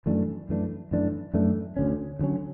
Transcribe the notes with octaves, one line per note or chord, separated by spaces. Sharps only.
F#2 E3 A3 D4
F#2 E3 A3 D4
F#2 E3 A3 D4
F#2 E3 A3 D4
D2 D3 F#3 C#4
D2 D3 F#3 C#4